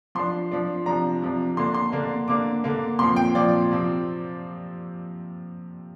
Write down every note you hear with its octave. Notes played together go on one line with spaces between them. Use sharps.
F3 D4 C6
F3 D4
C3 F3 D4 A#5
C3 F3 D4
D3 A#3 D4 C6
C6
D3 A#3 D4
D3 A#3 D4 D6
D3 A#3 D4
A#2 F3 C4 C6
G5
A#2 F3 C4 D5
C3 F3 C4